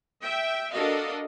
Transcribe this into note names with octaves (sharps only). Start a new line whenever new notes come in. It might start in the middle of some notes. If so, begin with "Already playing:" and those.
E5 G5
D4 F#4 A4 A#4 D#5 F5